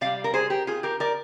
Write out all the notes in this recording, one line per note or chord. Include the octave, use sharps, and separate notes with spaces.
C3 G3 D5 F5
A#4
G#4 C5
G4 A#4
F4 G#4
G4 A#4
A#4 D5